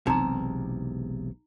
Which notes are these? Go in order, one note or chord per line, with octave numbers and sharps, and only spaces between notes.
E1 B1 E2 C3 D#4 A#5